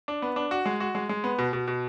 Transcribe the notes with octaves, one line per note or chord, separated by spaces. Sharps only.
D4
B3
D4
F#4
G#3
F#4
G#3
G#3
B3
B2
B2
B2